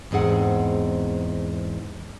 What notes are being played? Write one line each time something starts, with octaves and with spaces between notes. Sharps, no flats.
E2 G#2 C4 G#4 F#5